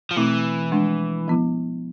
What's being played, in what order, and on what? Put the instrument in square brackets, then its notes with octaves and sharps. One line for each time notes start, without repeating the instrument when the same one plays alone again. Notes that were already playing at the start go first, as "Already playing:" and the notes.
[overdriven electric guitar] F3
[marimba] B2 A3 C4 E4 [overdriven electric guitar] E3
[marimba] F3 G#3 D4
F3 B3 E4